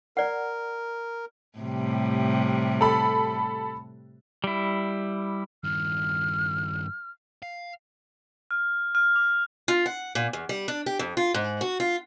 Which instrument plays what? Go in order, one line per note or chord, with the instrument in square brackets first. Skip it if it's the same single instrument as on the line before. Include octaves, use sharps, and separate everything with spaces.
[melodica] A#4 [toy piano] D5 F#5
[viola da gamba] A2 C3 G3
[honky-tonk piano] A4 B5
[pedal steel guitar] G3 E4
[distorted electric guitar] G2 D#3 [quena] F6
[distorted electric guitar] F5
[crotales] F6
F6
D6
[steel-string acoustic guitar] F4
F#5
A#2
E2
G3
D4
G4
F2
F4
G#2
F#4
F4